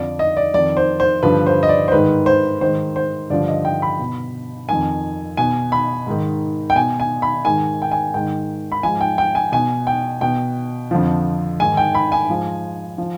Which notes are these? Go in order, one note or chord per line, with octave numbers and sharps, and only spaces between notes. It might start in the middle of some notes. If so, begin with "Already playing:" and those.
Already playing: F2 D3 F3 D5
D#5
D5
F2 D#3 D5
C5
C5
G2 D3 F3 B4
C5
D#5
D5
C5
G#2 D#3 B4
C5
G#2 D#3 C5
C5
G2 D3 F3 D5
D#5
G5
B5
B2
F2 D#3 G#5
B2 G#5
B5
G#2 D#3
G5
B2 G#5
G#5
B5
G#2 D#3 G#5
G5
G#5
G#2 D#3 G5
B5
G#2 F3 G#5
G5
G5
G#5
B2 G#5
G5
B2 G5
F2 D3 F3
G#2 D#3 G#5
G5
B5
G#5
G#2 F3
F3